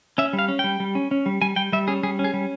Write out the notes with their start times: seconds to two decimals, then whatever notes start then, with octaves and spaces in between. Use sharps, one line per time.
0.18 C#4 E5
0.33 G3
0.39 F5
0.48 C#4
0.59 G3 G5
0.80 G3
0.95 C#4
1.11 C#4
1.26 G3
1.42 G3 G#5
1.56 G3 G5
1.73 G3 E5
1.88 C#4 G#4
2.03 G3 G#4
2.19 C#4
2.24 G#4
2.34 G3